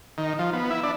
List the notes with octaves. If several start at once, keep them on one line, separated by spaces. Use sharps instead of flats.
D#3
F3
B3
E4
D4